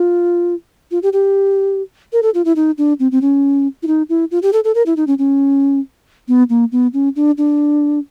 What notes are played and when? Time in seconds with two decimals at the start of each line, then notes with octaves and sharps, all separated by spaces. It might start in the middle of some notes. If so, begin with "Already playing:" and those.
Already playing: F4
0.91 F4
1.02 G4
1.13 G4
2.12 A#4
2.22 A4
2.34 F4
2.45 E4
2.56 D#4
2.78 D4
2.99 C4
3.12 C4
3.21 C#4
3.82 E4
3.87 D#4
4.09 E4
4.31 F4
4.42 G4
4.53 A4
4.64 A4
4.75 A#4
4.86 E4
4.96 D#4
5.07 C#4
5.18 C#4
6.28 B3
6.49 A#3
6.72 B3
6.93 C#4
7.16 D4
7.38 D4